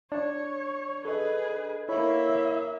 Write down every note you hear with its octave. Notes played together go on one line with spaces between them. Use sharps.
D4 C#5
G#4 A4 B4 D#5
A#3 E4 C#5 E5 B5